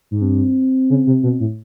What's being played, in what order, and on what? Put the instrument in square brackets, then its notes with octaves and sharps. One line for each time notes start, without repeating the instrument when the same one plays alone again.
[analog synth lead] G#2
[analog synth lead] G2 [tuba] C4
[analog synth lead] C#3
C3
B2
A2